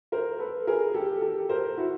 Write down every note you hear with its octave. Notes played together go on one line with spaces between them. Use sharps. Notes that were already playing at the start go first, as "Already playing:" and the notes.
A#4 C5
A4 B4
G#4 A#4
G4 A4
G4 A4
A#4 C5
E4 F#4